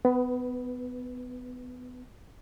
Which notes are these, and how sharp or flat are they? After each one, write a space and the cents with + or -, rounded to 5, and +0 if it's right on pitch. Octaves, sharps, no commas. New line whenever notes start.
B3 +25 B4 +0